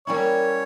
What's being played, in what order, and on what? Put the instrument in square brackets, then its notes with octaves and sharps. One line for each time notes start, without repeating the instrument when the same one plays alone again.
[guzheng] G3 A#3 C#4 E4 [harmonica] C#5